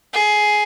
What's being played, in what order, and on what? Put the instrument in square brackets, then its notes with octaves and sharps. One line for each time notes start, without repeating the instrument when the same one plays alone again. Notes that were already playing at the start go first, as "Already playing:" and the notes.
[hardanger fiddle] G#4